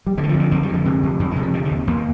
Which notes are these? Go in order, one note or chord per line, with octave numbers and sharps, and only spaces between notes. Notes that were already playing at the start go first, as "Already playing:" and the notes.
G3
D3 G#3
D#3
F3
F2
D#3
F2 D#3
G3
D3
G#3
C3
F2
F2 G3
G#3
C3
F3
D3 D#3
D#3
D#2
D#2 A#3